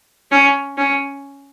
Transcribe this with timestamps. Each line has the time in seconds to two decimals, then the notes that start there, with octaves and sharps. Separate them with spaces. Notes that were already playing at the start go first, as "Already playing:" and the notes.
0.31 C#4
0.77 C#4